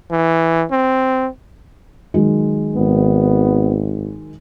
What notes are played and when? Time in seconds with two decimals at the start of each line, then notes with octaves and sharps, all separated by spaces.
0.11 E3
0.71 C4
2.14 D#3 F#3 G#3
2.75 G#1 B3